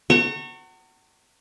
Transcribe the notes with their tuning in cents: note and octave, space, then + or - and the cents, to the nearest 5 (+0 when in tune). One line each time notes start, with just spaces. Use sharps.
F#5 +30 A#5 -45 C#6 -15